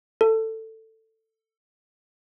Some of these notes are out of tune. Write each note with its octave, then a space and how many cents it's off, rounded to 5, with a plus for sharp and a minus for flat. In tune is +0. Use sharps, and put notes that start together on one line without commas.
A4 +15